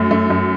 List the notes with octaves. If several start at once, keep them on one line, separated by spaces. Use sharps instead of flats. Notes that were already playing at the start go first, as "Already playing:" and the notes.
Already playing: F#2 A3
F#2 A3
F#2